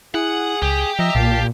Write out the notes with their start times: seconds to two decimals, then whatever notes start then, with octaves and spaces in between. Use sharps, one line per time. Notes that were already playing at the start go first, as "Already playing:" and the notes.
0.14 E4 G#4 F#5
0.62 C#2 G4
0.99 F3 D#5 E5 A#5
1.15 B1 A#2 F5 A5